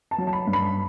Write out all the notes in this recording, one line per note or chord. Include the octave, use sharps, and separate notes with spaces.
A5
F#3
A5
B5
G2
B5